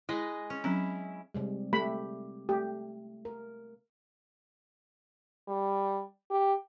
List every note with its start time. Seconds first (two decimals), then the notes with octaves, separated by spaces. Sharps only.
0.09 G#3 E4 B4 D#5
0.50 C#4
0.64 F#3 C4 C#4 E4
1.34 C3 G3 G#3
1.73 A3 G4 B5
2.49 A3 G4
3.25 A#4
5.48 G3
6.31 G4